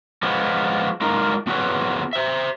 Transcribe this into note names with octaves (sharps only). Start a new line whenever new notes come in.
F3 G#3 B3
G#3 D#4 F4 A#4
B3 F4 F#4 G#4 B4 C#5
C5 E5